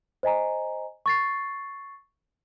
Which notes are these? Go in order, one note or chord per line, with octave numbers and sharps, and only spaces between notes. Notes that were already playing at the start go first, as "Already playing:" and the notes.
C5 D#5 G#5 A#5
C#6 A6 C7